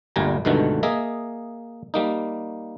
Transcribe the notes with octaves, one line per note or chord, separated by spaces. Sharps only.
G1 D2 A#2 G3 G#5 A#5
C#2 G2 B2 D3 D#3 A3
A#3 G#4 D#5 E5
G3 A#3 D#4